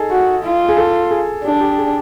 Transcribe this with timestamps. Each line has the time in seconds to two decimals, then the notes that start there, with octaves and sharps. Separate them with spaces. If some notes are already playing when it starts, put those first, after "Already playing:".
Already playing: D#4 G#4 A4
0.11 F#4
0.43 F4
0.69 G#4
0.77 A4
1.11 G#4
1.44 D4 G4
1.61 G4
1.78 G#4